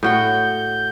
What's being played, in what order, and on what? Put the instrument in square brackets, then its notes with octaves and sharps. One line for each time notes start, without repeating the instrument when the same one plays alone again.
[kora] A2 F#4 G5 [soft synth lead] G6